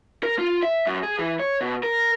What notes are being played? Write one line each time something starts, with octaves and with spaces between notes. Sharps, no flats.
A#4
F4
E5
F#2
G#4
E3
C#5
B2
A#4